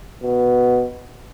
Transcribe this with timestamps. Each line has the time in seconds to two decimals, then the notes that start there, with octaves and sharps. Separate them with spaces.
0.23 B2